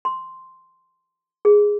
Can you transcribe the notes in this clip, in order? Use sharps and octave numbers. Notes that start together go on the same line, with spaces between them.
C6
G#4